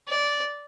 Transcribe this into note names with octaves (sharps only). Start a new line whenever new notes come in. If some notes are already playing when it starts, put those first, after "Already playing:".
D5